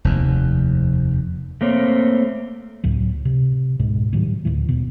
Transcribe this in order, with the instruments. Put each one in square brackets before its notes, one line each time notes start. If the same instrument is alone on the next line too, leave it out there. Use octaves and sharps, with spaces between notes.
[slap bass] F1 D#2
[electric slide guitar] A3 A#3 C4 C#5
[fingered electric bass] C#2 A2 F#3
C3
C#2 G#2 B2 G#3
A2 D#3 F#3 G3
D2 A2 E3
D#1 B2